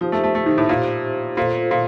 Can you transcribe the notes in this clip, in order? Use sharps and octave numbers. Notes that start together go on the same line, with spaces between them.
F3 D#4 G4 C5
A3
A3
A3
D#3
A2
A#2
A#2 F4 A4 C5 F5
A#2